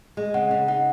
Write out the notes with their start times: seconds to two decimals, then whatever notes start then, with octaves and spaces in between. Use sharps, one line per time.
0.17 G#3
0.34 C#3 F#5
0.51 C#3
0.68 D#4 F#5